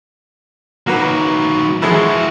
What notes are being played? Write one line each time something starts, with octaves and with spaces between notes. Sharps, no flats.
D#3 F#3 A#3 F#4 B4
E3 F3 G#3 E4 F#4